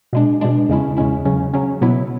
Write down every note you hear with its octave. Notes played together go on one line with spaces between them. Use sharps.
B2 G#3 D4
B2 G#3 D4
E2 C#3 G#3 C#4 E4
E2 C#3 G#3 C#4 E4
C#3 F#3 C#4
C#3 F#3 C#4
B2 F#3 B3 E4